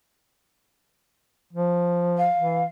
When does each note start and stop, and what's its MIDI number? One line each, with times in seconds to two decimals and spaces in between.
1.53 2.28 53
2.17 2.65 77
2.38 2.64 52